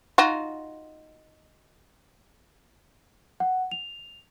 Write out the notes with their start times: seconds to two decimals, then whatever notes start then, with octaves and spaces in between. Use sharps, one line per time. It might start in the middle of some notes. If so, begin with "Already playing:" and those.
0.18 D#4 F4 F#4
3.40 F#5
3.72 F7